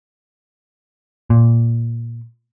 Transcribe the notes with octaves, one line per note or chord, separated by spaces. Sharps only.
A#2